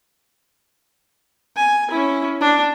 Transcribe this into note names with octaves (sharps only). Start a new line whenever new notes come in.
G#5
C#4 E4
D4